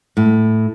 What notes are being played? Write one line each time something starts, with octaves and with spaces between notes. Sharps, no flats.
A2